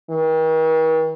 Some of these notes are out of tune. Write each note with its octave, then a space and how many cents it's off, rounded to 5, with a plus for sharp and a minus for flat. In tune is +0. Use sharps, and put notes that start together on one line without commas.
D#3 +45